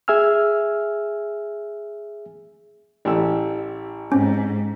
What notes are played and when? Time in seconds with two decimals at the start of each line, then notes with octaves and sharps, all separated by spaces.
0.08 G#4 E5 G#5 E6 F6
3.05 A1 G4 E6
4.12 G#2 C4 C#4